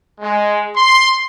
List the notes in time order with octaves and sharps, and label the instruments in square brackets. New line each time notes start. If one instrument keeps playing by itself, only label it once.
[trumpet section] G#3
C6